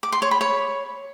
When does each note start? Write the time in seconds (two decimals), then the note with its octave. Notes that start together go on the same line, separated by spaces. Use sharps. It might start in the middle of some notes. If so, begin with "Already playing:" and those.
0.03 D6
0.12 C6
0.22 C#5
0.31 B5
0.41 C#5